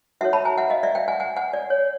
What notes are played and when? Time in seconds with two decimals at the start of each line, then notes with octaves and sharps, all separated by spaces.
0.21 D#4 F#4 A4 C#5 E5 F#5
0.33 A5 B5
0.45 G#5 A#5
0.58 E5 F#5
0.70 D#5 F5
0.83 D5 E5
0.95 F5 G5
1.08 F#5 G#5
1.20 F#5 G#5
1.36 F#5 G#5
1.53 D5
1.70 C#5